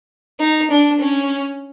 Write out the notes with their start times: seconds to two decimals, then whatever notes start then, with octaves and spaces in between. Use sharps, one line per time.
0.40 D#4
0.70 D4
0.99 C#4